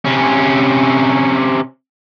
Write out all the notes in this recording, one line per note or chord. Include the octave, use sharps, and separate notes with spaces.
C3 C#4